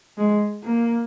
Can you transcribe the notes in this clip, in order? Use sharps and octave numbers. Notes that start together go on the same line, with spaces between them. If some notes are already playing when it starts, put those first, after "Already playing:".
G#3
A#3